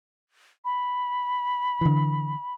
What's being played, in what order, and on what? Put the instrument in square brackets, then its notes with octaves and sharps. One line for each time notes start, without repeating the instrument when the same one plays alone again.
[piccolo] B5
[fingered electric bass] D3 E3